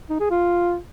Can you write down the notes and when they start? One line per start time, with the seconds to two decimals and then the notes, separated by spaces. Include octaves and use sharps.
0.10 D#4
0.20 G#4
0.31 F4